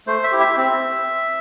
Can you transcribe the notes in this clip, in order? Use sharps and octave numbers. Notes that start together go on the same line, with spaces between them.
A3 C5
E5
E4 G4
E5
C4